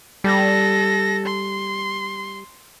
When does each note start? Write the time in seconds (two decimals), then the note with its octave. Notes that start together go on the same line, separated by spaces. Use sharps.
0.24 G3 A4 A#6
1.26 C6